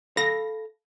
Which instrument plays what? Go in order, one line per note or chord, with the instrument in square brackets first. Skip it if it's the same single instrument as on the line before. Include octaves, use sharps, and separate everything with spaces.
[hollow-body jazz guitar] A4 F5 B5 [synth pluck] A#6